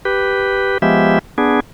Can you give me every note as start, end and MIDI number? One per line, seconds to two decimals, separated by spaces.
0.05 0.78 67
0.05 0.78 71
0.82 1.19 53
0.82 1.19 56
0.82 1.19 59
0.82 1.19 67
0.82 1.19 76
1.38 1.60 59
1.38 1.60 62
1.38 1.60 68